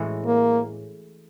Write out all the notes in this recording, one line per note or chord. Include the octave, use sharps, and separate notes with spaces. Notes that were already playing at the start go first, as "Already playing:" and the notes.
Already playing: A2 E3 G#3 C#4 F#4
A#3